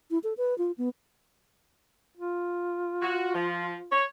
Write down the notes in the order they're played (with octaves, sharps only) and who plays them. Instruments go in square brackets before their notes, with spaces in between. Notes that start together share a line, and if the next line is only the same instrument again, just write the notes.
[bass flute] E4
A4
B4
F4
B3
[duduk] F4
[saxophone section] F#4
F3
C#5